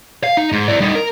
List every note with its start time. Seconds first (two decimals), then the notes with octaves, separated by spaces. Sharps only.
0.24 F5
0.37 D#4
0.52 G#2
0.68 E4 D5
0.80 G3 D#4
0.95 A#4